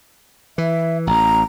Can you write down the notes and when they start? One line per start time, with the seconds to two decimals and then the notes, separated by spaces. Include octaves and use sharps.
0.58 E3 E5
1.07 A1 A#5